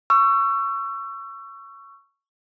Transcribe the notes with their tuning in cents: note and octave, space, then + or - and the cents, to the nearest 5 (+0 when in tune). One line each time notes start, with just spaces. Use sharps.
C#6 +0 E6 +35